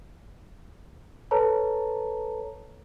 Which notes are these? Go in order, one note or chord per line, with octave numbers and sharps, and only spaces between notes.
A4 B4 C#5 A5 A#5